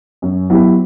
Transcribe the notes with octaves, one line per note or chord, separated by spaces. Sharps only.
F#2
F#3 B3 E4 G4